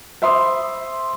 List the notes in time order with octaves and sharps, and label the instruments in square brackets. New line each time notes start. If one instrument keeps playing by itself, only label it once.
[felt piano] C5 E5 B5 C6 D6 D#6